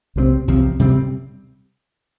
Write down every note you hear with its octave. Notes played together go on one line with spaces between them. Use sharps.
C2 C3 F3 C4
C2 C3 F3 C4
C3 G3 C4